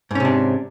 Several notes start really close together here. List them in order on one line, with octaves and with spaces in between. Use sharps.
G#2 C#4 C3 D4